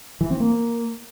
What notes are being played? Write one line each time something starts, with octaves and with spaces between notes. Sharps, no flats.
E3
C4
A#3